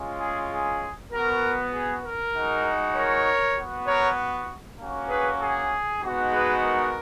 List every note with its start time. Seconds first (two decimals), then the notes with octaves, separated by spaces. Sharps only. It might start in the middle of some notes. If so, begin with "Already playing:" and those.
Already playing: G#3 C#4 F4
0.20 G#4
0.52 G#4
1.12 B3 F#4 A#4
1.74 G#4
2.04 A#4
2.35 G#3 D#4 F#4
2.96 A#4 C#5
3.57 B3 F#4
3.87 A#4 C#5
4.79 A#3 C#4 F#4
5.09 G#4 B4
5.40 G#4
6.02 G#3 B3 D#4 F#4
6.31 G#4 B4
6.62 A#4